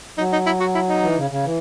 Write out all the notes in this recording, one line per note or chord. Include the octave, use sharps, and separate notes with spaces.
F#3 D#4
D#4
E4
F#4
E4
D#4
E3
C#3
C#3
E3